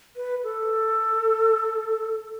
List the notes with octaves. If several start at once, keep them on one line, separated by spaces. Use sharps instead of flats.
B4
A4